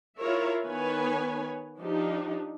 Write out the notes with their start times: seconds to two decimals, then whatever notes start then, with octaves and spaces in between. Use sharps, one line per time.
0.20 E4 F4 A#4 C#5 E5
0.66 D#3 B3 B4 C#5 G#5
1.79 F3 D4 D#4 G4